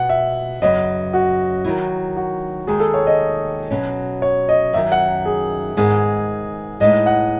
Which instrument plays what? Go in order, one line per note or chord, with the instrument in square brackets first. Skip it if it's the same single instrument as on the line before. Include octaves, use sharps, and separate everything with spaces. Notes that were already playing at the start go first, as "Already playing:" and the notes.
Already playing: [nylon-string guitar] B2 B3 [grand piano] F#5
[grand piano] E5
[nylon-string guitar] F#2 C#3 F#3 B3 [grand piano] D#5
[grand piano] F#4
[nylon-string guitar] D#3 F#3 B3 E4
[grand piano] F#4
[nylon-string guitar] D#2 D#3 G#3 [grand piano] G#4
[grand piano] A4
C#5
D#5
[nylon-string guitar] B2 F#3 C#4
[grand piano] C#5
D#5
[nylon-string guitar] F#2 D#3 F#3 [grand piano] E5
[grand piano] F#5
G#4
[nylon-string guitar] G#2 D#3 G#3 B3 [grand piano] G#4
[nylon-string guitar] A2 G#3 B3 D#4 [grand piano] D#5
[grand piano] F#5